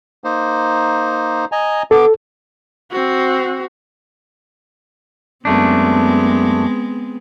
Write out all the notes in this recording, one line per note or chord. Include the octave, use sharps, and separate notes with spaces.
A#3 D#4 C5
D#5 G#5 A#5
B3 A4 D6
C4 F#4
F#2 G#3 A3 B3 C4 D4